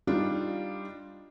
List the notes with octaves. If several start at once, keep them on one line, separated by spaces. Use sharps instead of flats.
G3 D4 D#4 F4